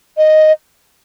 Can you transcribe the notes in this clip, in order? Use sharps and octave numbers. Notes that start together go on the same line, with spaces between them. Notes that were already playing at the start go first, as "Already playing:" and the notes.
D#5